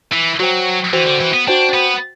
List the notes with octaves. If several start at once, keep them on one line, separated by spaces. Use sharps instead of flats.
E3
F#3 F#4 C5 G5
E3 F#4 C5 G5
D3
E3
B3
D4 F#4 C5 G5
B3